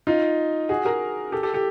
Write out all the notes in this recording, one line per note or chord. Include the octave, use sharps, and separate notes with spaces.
D#4 F4
F#4 G#4
G#4 A#4
G4 A4
G4 A4
G4 A4